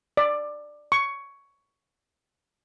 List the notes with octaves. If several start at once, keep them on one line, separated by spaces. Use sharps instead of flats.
D5
C#6